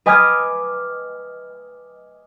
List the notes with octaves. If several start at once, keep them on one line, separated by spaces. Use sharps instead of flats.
B4 D#5 G#5 D6 F6 G#6